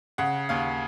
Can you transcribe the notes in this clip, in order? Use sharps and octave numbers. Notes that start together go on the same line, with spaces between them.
C#3 F#5
D#2 F5